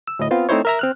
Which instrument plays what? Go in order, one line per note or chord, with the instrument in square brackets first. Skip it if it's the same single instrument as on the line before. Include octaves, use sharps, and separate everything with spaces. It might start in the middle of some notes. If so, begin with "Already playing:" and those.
[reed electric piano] E6
D2 A2 D#5
B3 C4 F4
A3 C4 D#4 E4 C5 C#5
A#4 E5 A#5
C4 F6 F#6